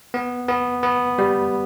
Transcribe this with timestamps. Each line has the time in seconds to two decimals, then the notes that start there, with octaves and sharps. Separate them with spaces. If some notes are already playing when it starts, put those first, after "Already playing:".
0.14 B3
0.48 B3
0.83 B3
1.18 G3